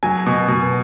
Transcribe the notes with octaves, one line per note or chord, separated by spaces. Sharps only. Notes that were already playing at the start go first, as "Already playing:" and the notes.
F#3 G#5
B2
B2